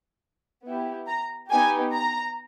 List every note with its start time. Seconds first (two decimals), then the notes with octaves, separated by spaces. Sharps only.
0.64 B3 E4 G4
1.07 A#5
1.50 B3 D#4 G4 G#5
1.93 A#5